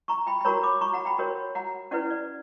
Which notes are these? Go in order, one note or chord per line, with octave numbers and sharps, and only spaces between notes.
A#5 C#6
G5 B5
B5
F#4 A#4 C#5 A#5 C#6
B5 D6
A#5 C#6
F#5 A#5
G5 B5
F#4 A#4 C#5
F#5 A#5
C#4 E4 B4 D5 F#5
D5